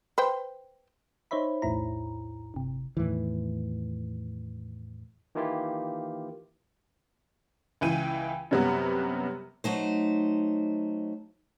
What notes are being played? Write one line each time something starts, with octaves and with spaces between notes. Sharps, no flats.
B4 C5 G5
D#4 C5 C#5 E5 B5
B1 E2 A2 E4 A#5
G1 C3
E2 A2 D#3 E3
D#3 E3 A#3 E4 F4 G4
C#2 E3 G5 D#7
F#2 C3 F#3 G3 B3 F#4
F#3 A3 D#4 C5